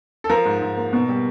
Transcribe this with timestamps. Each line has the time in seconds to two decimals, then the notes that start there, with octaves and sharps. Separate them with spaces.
0.24 A4
0.29 F3 A#4
0.45 G#2
0.61 G#2
0.77 A#3
0.93 B2
1.09 G3